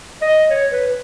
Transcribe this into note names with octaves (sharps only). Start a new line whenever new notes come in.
D#5
C#5
B4